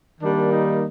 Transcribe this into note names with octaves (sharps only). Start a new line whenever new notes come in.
D#3 G3 A#3 D4
D#4